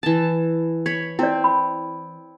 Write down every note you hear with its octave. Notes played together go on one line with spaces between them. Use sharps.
E3 A5
C#5 B5
C4 E4 D5
B5